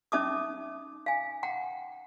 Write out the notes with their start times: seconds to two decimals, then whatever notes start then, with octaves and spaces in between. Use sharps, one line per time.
0.12 C#4 D#4 E5 A5 D6 D#6
1.06 F5 G#5
1.43 F#5 G5 A#5